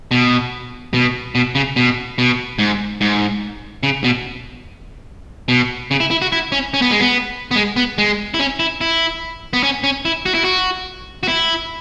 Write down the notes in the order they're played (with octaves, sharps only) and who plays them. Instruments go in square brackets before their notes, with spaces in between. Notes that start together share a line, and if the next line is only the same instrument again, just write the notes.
[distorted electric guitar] B2
B2
B2
C#3
B2
B2
G#2
G#2
C#3
B2
B2
C#3
E4
E4
F#4
E4
C#4
C#4
B3
G#3
B3
B3
G#3
B3
G#3
E4
C#4
E4
E4
B3
C#4
C#4
E4
F#4
E4
F#4
F#4
E4